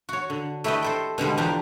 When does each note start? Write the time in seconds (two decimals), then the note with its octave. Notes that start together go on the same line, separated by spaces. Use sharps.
0.09 F#4 C#5
0.30 D3
0.64 A3 E4 G4 B4 D5 D#5
0.82 A4 C5 G5
1.18 B2 D3 G3 G#3
1.37 E2 F3 D4 G4 G5 A#5